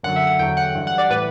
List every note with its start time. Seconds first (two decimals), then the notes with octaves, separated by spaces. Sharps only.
0.03 F#2 D3 F#3 F#5
0.16 E5
0.27 F#5
0.39 E2 D3 F#3 G5
0.57 F#5
0.75 G2 E3
0.87 F#5
0.98 D5
1.10 A2 E3 B4